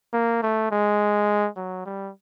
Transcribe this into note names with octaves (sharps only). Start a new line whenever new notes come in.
A#3
A3
G#3
F#3
G3